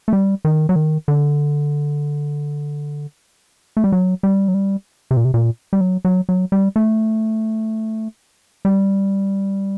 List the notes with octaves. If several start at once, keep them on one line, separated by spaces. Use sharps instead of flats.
A3
G3
D#3
F#3
D#3
D3
A3
G3
F#3
G3
F#3
G3
C3
A#2
C3
A#2
G3
F#3
F#3
F#3
G3
A3
G3